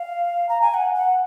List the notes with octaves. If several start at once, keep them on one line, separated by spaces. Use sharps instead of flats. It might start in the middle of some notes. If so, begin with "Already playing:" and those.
Already playing: F5
A#5
G#5
F#5
F#5